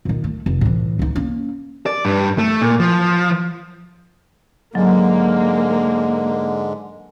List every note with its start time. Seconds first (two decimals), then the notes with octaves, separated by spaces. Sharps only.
0.05 A#2 D#3
0.24 A3
0.46 F1
0.61 A2 E3
0.99 C#2 D#4
1.16 A#3 C#4
1.86 D5
2.05 G2
2.38 A3
2.61 A#2
2.80 F3
4.75 G#2 D3 F#3 G#3 A#3